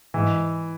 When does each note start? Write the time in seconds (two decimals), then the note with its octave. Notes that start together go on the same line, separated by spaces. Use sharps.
0.14 G#2 E3